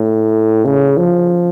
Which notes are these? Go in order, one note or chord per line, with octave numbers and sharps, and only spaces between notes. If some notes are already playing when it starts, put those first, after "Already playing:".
Already playing: A2
C#3
F3